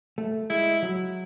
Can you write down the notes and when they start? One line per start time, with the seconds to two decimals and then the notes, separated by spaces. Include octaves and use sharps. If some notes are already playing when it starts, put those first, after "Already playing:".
0.18 A3
0.50 G#3 E4
0.83 F#3